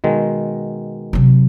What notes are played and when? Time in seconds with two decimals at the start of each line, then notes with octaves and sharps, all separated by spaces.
0.04 B2 D#3 G#3
1.13 C3 F#3